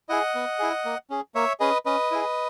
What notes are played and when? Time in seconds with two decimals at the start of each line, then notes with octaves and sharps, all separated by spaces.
0.09 E4 G#4 D#5 F#5
0.35 B3
0.59 E4 G#4
0.85 A#3
1.10 C#4 G#4
1.35 A#3 C#5 E5
1.60 C#4 G#4 B4 D#5
1.85 C#4 B4 D#5
2.11 E4 G#4